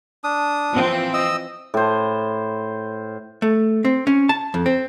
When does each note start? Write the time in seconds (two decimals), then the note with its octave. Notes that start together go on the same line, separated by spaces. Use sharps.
0.24 D4 D#6
0.73 E3 F3 C4
1.14 D#5 E6
1.74 A2 C5
3.42 A3
3.85 C4
4.07 C#4
4.29 A5
4.54 F2
4.66 C4